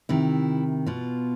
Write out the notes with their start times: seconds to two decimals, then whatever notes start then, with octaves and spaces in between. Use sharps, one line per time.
0.09 C3 D#3 E4
0.86 B2 F4